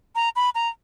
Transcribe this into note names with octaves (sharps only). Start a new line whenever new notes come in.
A#5
B5
A#5